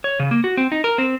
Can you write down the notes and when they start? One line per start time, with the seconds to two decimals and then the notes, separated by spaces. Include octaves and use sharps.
0.04 C#5
0.19 C#3
0.31 A#3
0.44 F#4
0.57 C4
0.72 D#4
0.84 A#4
0.98 C4